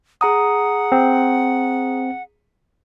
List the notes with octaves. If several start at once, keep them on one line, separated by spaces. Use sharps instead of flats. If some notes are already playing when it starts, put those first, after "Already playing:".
G#4 F#5 A#5 D#6
C4